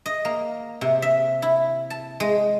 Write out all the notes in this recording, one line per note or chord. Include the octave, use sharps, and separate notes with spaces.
D#5
A#3
C3
E5
E4
A5
G#3